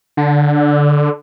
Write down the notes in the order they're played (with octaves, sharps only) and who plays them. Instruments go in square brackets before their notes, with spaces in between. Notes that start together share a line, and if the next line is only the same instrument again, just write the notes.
[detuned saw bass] D3